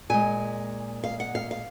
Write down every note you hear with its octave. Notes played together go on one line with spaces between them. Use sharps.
A#2 G#3 G#5
F5
F#5
F5
F5